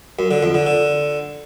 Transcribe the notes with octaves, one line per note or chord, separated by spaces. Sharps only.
F#2
D3
F2
D3
D3